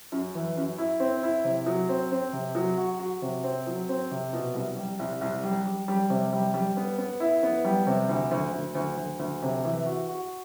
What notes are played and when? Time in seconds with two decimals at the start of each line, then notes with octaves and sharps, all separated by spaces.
0.12 F#2
0.35 E3
0.57 F#2
0.78 E4
1.00 C4
1.23 E4
1.44 C3
1.66 F#3
1.89 C4
2.12 C4
2.33 C3
2.55 F#3
2.78 F#4
3.00 F#4
3.22 C3
3.44 C4
3.67 F#3
3.89 C4
4.11 C3
4.33 B2
4.54 C2
4.76 G3
4.99 C2
5.21 C2
5.43 G3
5.65 G3
5.88 G3
6.10 C3
6.33 G3
6.54 G3
6.77 B3
6.98 B3
7.20 E4
7.43 B3
7.65 G3
7.87 C3
8.09 D2
8.31 D2
8.54 D2
8.75 D2
8.97 D2
9.19 D2
9.42 C3
9.65 E3
9.86 F#4
10.09 F#4